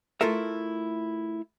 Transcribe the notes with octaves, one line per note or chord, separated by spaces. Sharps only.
A3 E4 F4 A4 A#4 E5